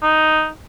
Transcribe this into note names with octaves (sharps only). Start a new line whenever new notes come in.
D#4